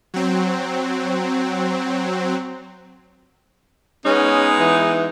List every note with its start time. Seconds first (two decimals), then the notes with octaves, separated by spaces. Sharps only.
0.14 F#3 C4
4.06 G#3 B3 C#4 D#4
4.60 E3